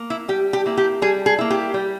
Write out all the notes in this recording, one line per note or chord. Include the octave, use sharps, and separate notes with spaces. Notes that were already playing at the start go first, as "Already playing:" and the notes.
Already playing: A#3
E4
G3 G4
G4
A#3 E4
G4
G3 G#4
G#4
A#3 E4
G4
G3